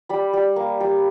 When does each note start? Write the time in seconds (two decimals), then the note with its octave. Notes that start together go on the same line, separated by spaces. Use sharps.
0.09 G3 B5
0.33 G3
0.56 A#3
0.80 G3